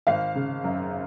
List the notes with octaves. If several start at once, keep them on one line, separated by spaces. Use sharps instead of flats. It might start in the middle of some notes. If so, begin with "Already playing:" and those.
G#1 F5
C#3
F#2